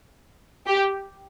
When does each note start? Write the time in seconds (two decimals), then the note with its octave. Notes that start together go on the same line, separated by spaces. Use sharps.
0.66 G4